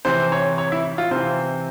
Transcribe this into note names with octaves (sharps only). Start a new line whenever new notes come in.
C3 E3 C5
C#5
C#5
E4
F4
C3 E3 C5